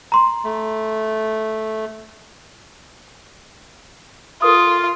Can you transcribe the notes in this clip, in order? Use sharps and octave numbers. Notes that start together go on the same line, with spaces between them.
A#5 C6
A3
F4 A4 A#4 D#6